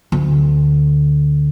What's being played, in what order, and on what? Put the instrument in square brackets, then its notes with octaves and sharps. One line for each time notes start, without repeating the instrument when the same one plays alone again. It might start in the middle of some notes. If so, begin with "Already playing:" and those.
[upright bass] D2